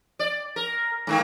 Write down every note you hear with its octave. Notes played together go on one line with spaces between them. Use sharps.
D5
A#4
G#2 D#3 A#3